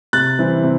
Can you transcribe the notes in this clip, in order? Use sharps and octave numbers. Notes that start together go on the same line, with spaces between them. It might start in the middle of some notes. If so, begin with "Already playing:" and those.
C3 F#6 A6
E3 G3 C4
C3